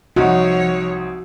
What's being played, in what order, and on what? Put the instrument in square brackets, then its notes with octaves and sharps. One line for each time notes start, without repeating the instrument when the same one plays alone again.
[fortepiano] C2 D#4 [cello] F3 C#5 [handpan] F#4